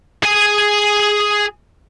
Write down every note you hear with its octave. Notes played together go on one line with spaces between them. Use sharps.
G#4 G#5